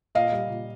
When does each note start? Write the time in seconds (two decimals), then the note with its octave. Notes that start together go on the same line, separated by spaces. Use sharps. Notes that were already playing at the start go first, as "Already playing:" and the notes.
0.15 A#2 D#5 F5
0.32 G3
0.49 A#2